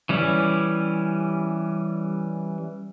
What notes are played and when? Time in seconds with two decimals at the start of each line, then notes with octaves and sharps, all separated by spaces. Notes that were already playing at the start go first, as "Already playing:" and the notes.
0.09 E3 G3 C#4